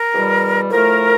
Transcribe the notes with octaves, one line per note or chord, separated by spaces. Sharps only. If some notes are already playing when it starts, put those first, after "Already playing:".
Already playing: A#4
E2 B2 G3
A2 F3 A3 A#4